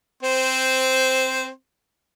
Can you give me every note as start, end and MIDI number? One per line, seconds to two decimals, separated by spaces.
0.23 1.49 60
0.23 1.49 72